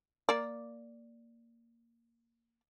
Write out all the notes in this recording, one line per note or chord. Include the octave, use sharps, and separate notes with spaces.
A#3 D5